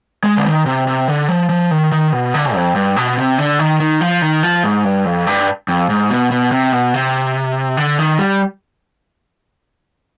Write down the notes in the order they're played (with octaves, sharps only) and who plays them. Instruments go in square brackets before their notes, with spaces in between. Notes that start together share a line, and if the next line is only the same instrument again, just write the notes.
[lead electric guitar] G#3
D3
D#3
C3
C3
D3
F3
F3
D#3
D#3
B2
D3
F2
G2
B2
C3
D3
D#3
D#3
F3
D#3
F3
G#2
G2
F2
G2
F2
G#2
B2
B2
C3
B2
C3
D3
D#3
G3